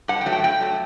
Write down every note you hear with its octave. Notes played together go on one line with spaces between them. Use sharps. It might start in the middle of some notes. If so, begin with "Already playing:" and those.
G2 F#5
G5
F#3 A3
G5
G2 G5
F#3 A3